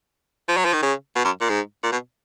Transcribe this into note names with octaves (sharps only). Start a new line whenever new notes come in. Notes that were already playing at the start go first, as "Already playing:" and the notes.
F3
F#3
F3
D#3
C#3
B2
F#2
A#2
G#2
A#2
B2